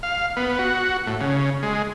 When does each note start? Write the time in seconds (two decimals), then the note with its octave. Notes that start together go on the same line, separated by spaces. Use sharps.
0.03 F5
0.37 B3
0.59 F#4
1.07 A2
1.21 C#3
1.63 G#3